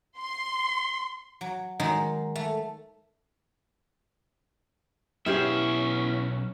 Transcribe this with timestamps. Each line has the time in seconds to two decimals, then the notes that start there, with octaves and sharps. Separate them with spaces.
0.19 C6
1.41 F#3
1.80 D#3 F#3 G#3 D#4
2.36 A3
5.26 B1 B3 C#4 E4 G4 G#4 E5 F5